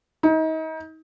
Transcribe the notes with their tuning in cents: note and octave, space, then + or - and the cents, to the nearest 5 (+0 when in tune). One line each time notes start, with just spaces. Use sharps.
D#4 +35